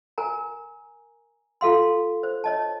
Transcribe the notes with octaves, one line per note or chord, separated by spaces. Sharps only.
A#4 G#5 A#5
F4 A4 F5 C6
C5
C#5 D#5 A5